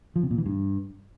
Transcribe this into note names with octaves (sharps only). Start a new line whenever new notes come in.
F3
C3
A#2
E3
G2